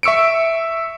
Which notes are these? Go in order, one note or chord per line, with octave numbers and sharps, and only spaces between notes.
E5 C#6 E6 C#7 D7